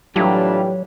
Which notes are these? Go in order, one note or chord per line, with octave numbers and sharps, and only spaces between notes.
A2 E3 F#3 G3 D4 E4 F4 G4